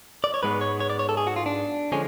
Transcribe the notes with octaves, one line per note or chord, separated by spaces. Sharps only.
D5
C#5
G#2 G#3 B3 B4
C#5
C#5
D5
C#5
A4
G#4
F#4
F4
D4
D3 F3 G#3 C#4